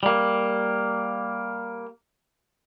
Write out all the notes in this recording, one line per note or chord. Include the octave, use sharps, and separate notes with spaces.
G3 A#3